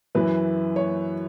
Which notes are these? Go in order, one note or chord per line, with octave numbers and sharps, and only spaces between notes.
F#2 E3 B4
C#5